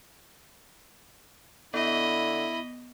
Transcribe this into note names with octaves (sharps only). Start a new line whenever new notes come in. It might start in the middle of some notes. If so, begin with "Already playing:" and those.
D3 B3 E4 D#5 B5